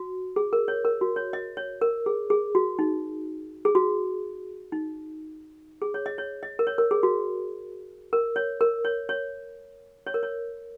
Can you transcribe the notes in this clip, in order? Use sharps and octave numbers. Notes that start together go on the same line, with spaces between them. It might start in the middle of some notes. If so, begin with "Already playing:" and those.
Already playing: F#4
G#4
A#4
C#5
A#4
F#4
C#5
D#5
C#5
A#4
G#4
G#4
F#4
D#4
G#4
F#4
D#4
G#4
C#5
D#5
C#5
D#5
A#4
C#5
A#4
G#4
F#4
A#4
C#5
A#4
C#5
C#5
C#5
A#4
C#5